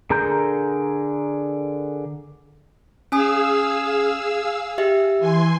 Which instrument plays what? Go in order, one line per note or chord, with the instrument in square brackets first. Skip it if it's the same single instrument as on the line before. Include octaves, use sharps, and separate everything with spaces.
[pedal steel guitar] D3 G#4 A#4 A#5 G6
[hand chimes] C#4 G#5 D#6 [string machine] G#4 F5 E6
[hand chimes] G4 E5
[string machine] E3 G#5 C6